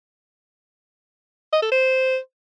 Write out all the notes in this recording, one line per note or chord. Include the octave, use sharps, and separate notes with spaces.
D#5
A4
C5